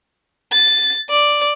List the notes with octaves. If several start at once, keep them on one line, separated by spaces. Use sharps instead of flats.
A6
D5